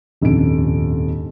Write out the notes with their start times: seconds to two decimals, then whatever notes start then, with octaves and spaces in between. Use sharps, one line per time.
0.21 D#1 F2 G#2 C#4 D4 D7